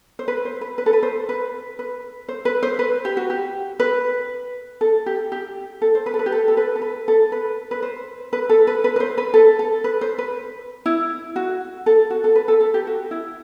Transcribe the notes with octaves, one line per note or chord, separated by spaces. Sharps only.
C5
B4
C5
B4
B4
A4
B4
C5
B4
B4
C5
B4
C5
B4
G4
F#4
G4
B4
A4
G4
G4
A4
C5
B4
A4
B4
G4
A4
A4
B4
A4
B4
A4
B4
B4
C5
B4
A4
B4
B4
B4
C5
B4
A4
A4
B4
C5
B4
E4
F#4
A4
F#4
A4
B4
A4
A4
G4
F#4
E4